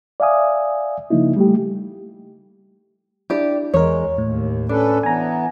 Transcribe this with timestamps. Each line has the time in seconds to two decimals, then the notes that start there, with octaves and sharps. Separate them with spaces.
0.20 D5 E5 F5 G#5 D#6
1.10 C#3 F3 A#3 D#4 E4
1.37 G3 A3 G4
3.30 D4 E4 G4 D5
3.74 E2 G#3 A#4 C#5
4.18 D#2 A2
4.69 C#4 D4 A4 B4
5.03 E3 B3 G#5 A#5